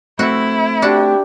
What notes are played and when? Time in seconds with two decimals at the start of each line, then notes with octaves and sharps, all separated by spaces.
0.19 A3 C4 E4 F#4
0.82 D4 F#4 G4